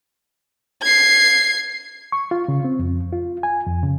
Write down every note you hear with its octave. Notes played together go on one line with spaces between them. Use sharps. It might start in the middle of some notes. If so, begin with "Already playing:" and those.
G#6 C7
C#6
F4
C#3
C4
F2
F4
G#5
F2
C#3